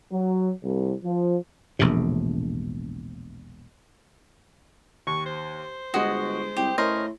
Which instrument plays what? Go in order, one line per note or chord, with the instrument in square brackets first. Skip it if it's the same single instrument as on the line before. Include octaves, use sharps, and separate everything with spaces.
[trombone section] F#3
C2
F3
[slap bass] E1 A#1 A2 C3
[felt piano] D#2 [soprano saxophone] C#6
[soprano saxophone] C5
[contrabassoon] G1 [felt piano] G#3 G#4 [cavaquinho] F#4 D#5
[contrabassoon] C2 [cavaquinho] G4
[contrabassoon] A2 [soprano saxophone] C#4 [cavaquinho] A#4 C5 D#5